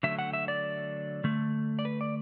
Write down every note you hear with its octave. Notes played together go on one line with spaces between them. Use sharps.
D3 F#3 A3 E5
F#5
E5
D5
D3 A3
D5
B4
D5